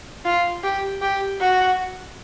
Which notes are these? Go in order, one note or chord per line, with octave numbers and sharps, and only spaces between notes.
F4
G4
G4
F#4